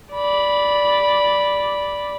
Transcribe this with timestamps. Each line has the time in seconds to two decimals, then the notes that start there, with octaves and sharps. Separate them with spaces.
0.14 D5 B5